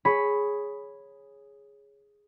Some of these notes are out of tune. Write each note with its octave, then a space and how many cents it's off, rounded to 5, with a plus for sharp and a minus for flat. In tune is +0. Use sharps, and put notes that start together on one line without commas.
G#4 +0 C#5 +0 B5 +0